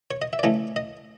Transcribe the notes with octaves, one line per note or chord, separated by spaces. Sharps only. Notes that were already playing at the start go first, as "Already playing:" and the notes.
C#5
D#5
E5
D5
C#3 E3 A3 C#4 D#5
D#5